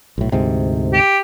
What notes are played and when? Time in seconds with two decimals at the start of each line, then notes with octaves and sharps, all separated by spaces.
0.18 B1 A2
0.32 D2 G#2 C3
0.93 G4